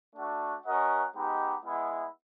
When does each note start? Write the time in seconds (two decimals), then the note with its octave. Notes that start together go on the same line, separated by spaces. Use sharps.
0.14 A3 D4 F#4
0.65 C#4 F#4 A#4 D#5 F#5
1.15 G#3 B3 D#4 G4
1.65 G#3 B3 E4